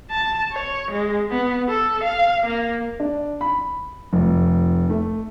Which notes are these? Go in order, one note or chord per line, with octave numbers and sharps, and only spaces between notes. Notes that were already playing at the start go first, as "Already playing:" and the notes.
A5
C#5
G#3
B3
A4
F5
A#3
D4
B5
F1
A3